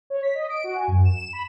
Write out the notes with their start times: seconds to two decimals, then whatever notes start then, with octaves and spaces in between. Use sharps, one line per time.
0.10 C#5
0.23 B6
0.35 D#5
0.50 D7
0.64 F#4
0.76 G#5
0.88 F#2
1.05 E7
1.33 B5